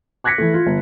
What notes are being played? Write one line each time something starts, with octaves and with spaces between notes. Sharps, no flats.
D6 F#6 G#6 A#6 B6 C#7
E3 A3
F4
G1